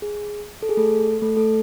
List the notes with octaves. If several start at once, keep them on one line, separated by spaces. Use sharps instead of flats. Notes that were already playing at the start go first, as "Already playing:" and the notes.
G#4
A4
G#4
A3 A4
A3 A4
A3 A4